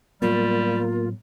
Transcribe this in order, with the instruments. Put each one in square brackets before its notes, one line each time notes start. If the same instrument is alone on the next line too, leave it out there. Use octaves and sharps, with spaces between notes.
[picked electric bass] A2 F#3 B3 [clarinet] G3 [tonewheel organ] A#3 [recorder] F4